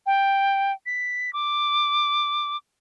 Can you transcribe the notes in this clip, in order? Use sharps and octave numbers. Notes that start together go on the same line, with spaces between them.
G5
B6
D6